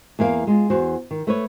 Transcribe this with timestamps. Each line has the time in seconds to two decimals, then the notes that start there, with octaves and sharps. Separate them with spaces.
0.19 E2 A#3 E4 F5
0.47 G#3 F4
0.70 E2 F#4 C5
1.11 D#3
1.27 A3 B4 C#5